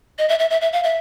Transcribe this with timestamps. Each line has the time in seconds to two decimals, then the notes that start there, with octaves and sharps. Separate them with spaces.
0.18 D#5
0.29 E5
0.39 E5
0.50 E5
0.61 E5
0.72 F5
0.83 E5